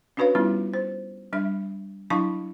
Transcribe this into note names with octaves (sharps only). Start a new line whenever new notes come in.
C#4 D4 F#4 B4 C#5 F5
G3 B3 C#4 E4 F4
C5
G3 D4 E5
F#3 D4 E4 F5 A5 C#6